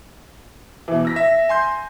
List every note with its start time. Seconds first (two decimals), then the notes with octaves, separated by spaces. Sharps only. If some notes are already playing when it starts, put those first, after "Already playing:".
0.88 B2 E3
1.05 E6 A#6 B6
1.16 E5
1.49 G#5 C6 G6